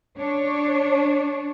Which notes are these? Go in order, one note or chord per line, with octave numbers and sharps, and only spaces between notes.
D4 C#5